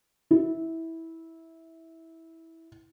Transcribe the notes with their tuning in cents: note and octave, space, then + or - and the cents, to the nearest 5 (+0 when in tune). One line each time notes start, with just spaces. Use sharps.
E4 -15